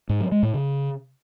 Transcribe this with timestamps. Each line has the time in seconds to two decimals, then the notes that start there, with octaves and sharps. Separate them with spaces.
0.09 G#2
0.21 F#3
0.32 G#3
0.43 A2
0.54 C#3